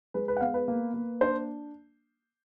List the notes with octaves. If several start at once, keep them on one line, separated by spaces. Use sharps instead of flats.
G#3 B4
B4
F#5
B3 F5
B4
A#3
A#3
D4 C5